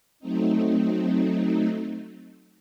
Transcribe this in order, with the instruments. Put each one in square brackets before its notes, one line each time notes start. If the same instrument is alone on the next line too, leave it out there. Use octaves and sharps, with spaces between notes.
[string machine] F#3 A3 C4 D#4